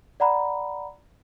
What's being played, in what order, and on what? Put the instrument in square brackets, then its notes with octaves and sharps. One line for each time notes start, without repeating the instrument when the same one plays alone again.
[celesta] D5 F#5 A#5 B5